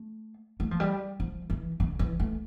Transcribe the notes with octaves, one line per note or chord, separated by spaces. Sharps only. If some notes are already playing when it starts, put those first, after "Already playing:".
Already playing: A3
A3
F3
G3
F3
E3
D3
E3
A3